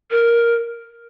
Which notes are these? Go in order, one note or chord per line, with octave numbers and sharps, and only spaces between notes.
A#4